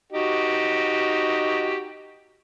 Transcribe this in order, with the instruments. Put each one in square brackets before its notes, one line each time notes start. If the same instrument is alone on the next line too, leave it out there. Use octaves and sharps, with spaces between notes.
[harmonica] D#4 F#4 G4